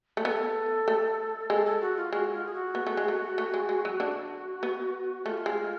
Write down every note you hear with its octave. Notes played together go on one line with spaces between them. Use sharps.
A3
B3 A4
A3
G#3 A4
A4
F#4
F4
G#3 F#4
F4
G#4
F#4
B3
A3
G#3
A3
A3
G#3
G#3
F#3
D3 D4 F#4
B3
A3 F4 F#4
G#3